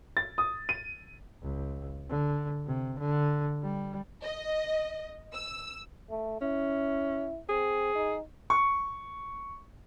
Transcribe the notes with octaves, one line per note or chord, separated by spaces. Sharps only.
A6
D#6
D#7
C#2
D3
C3
D3
G3
D#5
E6
A3
C#4 E4
C4 G#4
D#4
C#6